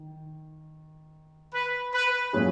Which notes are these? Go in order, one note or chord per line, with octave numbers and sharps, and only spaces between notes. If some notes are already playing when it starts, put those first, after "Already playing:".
Already playing: D#3
B4
B4
A#2 F#3 C#4 E4 G#4